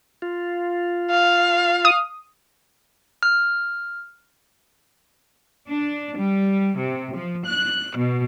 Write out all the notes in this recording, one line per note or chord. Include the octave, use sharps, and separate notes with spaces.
F4
F5
D#6
F6
D4
G3
C3
F3
F#6
B2